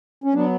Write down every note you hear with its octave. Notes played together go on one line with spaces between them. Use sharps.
C#4
F#3 B3 D4